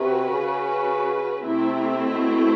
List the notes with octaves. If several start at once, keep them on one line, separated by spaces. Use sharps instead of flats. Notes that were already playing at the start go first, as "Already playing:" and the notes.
Already playing: C3 C#4 F#4 B4
C#3
C3 A3 C4 E4
B2